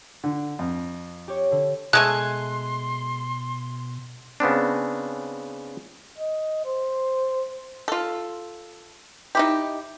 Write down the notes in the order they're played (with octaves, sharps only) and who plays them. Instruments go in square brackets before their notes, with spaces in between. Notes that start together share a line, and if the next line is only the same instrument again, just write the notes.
[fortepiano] D3
F2
[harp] G4 C#5
D3
[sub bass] B2 [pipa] G#3 A3 G#5 [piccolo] C6 [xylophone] F#6
[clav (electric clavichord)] C#3 B3 C4 D4
[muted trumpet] D#5
C5
[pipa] F4 A4
D#4 E4 G4